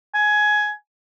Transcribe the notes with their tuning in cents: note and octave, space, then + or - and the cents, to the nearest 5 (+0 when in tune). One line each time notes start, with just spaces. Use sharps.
G#5 +15